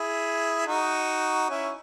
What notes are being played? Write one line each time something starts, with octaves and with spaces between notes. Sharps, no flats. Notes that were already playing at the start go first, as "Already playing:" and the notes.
Already playing: E4 G#4
D#4 F#4
C#4 E4